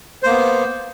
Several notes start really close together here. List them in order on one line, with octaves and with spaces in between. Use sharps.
C5 A#3 B3